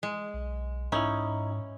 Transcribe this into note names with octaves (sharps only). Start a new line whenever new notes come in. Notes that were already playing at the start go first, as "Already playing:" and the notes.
G#3
B1
G#2 C#4 D#4 E4